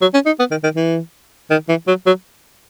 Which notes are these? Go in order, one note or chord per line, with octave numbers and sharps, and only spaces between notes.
F#3
C#4
D#4
B3
D#3
D#3
E3
D#3
E3
F#3
F#3